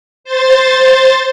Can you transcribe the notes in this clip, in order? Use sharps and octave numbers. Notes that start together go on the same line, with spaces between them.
C5 A6